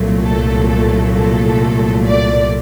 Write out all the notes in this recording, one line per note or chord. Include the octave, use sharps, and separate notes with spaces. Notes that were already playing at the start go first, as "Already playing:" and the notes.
Already playing: C2 A#2 F#3 A3
A4
A4
A4
D5